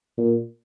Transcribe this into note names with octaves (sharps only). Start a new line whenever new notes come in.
A#2